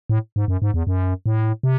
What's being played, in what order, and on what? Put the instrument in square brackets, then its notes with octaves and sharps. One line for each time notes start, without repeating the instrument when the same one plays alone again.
[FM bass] A2
G#2
F#2
G#2
E2
F#2
A2
C3